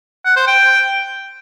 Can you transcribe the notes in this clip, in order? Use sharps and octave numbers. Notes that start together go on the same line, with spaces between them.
F#5
C5
G5